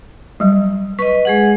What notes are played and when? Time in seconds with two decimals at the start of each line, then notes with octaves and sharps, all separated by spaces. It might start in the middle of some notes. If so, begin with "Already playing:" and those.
0.40 F#3 G3
0.99 B4 D#5 C#6
1.25 G#3 G#4 F#5